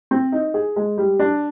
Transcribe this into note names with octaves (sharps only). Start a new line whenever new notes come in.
C4
D#4
G#4
G#3
G3
D4